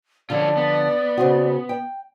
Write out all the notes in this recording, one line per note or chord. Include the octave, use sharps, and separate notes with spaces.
D3 F3 F4 A4 C#5 D5
B3
C#3 C4 F#4
G5